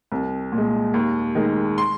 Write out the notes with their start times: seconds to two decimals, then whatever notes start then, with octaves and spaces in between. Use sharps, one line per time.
0.12 C2
0.52 A#2
0.58 G#3
0.94 D#2
1.35 D#3 G#3
1.78 C6